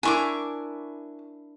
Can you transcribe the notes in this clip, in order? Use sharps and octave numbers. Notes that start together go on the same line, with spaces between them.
D4 E4 A#4 G#5 C#6 D6